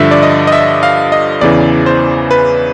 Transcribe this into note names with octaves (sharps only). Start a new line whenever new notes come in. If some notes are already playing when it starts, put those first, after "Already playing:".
Already playing: G2 D3 F3 E5
D5
D#5
D#5
E5
F5
D#5
E2 C#3 E3 D5
C5
B4